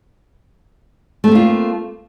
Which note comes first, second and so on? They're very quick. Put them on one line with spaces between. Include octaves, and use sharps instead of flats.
A3 C4 A#3 F4